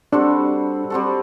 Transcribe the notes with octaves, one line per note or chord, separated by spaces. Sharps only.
G3 C4 D4 F#4 A4
G3 C4 F#4 A4